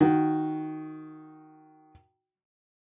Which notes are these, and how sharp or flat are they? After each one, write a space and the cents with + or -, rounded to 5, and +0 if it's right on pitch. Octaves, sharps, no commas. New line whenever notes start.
D#3 +0 F#4 +0